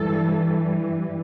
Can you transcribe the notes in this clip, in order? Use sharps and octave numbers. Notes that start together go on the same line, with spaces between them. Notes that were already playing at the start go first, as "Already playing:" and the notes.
Already playing: G2 E3 G3 A4